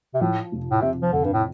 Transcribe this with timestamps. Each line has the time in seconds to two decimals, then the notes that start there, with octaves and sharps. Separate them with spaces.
0.14 C3
0.21 A2 F3
0.52 F1
0.71 A2
0.82 C3 C4
1.02 F3
1.13 F2 D3
1.24 G2
1.34 A2